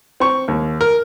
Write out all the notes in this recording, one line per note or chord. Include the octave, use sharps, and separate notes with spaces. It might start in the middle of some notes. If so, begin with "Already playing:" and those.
C4 C#6
D#2
A#4